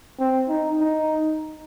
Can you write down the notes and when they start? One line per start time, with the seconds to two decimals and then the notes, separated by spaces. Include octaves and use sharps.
0.19 C4
0.49 D#4
0.79 D#4